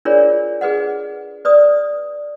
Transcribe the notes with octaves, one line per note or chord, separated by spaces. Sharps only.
D4 F4 G#4 A#4 C#5 D5
G#4 B4 D#5 F#5
B4 D5 D#6